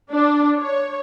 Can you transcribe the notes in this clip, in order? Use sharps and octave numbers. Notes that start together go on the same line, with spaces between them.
D4
C#5